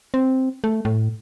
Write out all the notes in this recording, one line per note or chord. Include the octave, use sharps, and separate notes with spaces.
C4
A3
A2